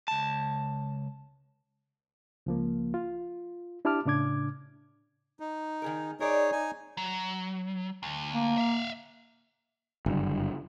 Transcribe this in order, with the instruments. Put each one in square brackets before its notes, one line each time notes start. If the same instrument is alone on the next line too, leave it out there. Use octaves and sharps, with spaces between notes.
[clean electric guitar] C#2 A5
[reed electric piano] C#2 F3 A#3
F4
D4 E4 G4 A5 D6 F6
A2 C#3 D4 D6 G#6
[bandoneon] D#4
[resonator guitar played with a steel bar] D#3 G#4 A#4
[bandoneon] D#4 G#4 C#5 [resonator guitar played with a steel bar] A#4 D5
[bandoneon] D#4 G#5
[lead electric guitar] F#3
D2
[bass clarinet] A#3
[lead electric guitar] E5 F5
[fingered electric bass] F#1 G2 D3